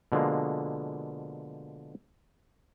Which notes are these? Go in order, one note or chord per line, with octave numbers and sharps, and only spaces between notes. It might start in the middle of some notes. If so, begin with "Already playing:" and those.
B2 D3 F3 G#3 A#3